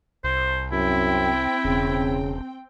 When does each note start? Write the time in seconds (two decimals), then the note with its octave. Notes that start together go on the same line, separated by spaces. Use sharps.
0.24 C2 C5
0.72 F#2 C4 E4 G5
1.65 E1 C#3